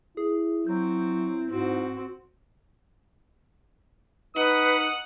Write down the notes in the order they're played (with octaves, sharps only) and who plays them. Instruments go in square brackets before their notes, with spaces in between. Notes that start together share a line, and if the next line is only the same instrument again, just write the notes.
[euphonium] E4 [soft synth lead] G#4
[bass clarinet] F#3 [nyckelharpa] C4 [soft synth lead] G6
[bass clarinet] G#2 [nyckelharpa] C4 F#4
[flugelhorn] D#4 [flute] B4 [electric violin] F#5 [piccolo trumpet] D#6